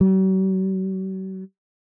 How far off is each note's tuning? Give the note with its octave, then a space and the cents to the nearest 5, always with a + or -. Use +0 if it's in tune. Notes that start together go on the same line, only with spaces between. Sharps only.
F#3 +45